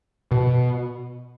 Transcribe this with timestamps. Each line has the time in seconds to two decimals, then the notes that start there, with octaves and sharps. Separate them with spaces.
0.31 B2